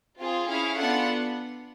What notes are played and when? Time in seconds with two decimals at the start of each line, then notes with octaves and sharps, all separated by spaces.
0.19 C4 F4 G#4
0.48 C#4 E4 G#4 F5
0.78 B3 D4 F4 A4 F#5